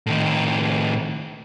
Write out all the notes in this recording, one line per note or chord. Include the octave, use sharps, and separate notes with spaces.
A2 D#3